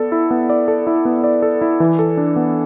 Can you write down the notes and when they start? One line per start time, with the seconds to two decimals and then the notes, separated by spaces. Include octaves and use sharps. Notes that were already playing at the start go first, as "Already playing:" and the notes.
Already playing: B3 A4 D5
0.12 E4
0.31 B3
0.50 D5
0.68 A4
0.87 E4
1.05 B3
1.24 D5
1.42 A4
1.62 E4
1.80 E3
1.99 A4
2.17 D4
2.36 B3